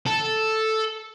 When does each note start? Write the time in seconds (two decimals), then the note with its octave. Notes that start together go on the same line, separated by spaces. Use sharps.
0.06 A4